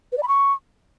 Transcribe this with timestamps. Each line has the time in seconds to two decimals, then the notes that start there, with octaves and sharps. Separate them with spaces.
0.12 B4
0.17 D5
0.23 B5
0.28 C#6